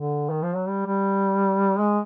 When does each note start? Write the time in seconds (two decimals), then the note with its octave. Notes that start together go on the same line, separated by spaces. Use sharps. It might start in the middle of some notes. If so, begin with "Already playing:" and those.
Already playing: D3
0.30 D#3
0.42 F3
0.55 F#3
0.68 G3
0.86 G3
1.80 G#3